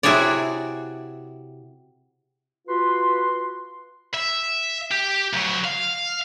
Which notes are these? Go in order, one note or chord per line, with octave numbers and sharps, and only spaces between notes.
C3 E4 F#4 G#4 C#5 D5
F4 F#4 B4 C6
E5
G4
D2 F#3
F5